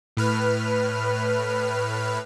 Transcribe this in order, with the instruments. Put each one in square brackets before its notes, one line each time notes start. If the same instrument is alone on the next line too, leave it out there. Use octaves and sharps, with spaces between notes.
[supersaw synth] A2 B4 F6